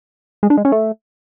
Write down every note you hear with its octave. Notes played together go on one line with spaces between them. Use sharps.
G#3
D4
G#3
C#4
A3